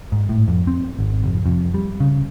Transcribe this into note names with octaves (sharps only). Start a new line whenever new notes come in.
G#2
A2
F2
C4
G#1
F1
F2
G3
C#3